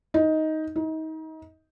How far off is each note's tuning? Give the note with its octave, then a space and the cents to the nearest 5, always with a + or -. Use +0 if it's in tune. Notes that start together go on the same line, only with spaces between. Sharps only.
D#4 +10
D#4 +30